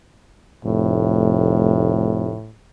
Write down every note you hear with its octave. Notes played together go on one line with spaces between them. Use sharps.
F1 A2